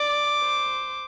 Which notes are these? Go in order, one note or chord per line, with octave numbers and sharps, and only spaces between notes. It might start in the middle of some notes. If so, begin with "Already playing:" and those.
Already playing: D5 D6
C5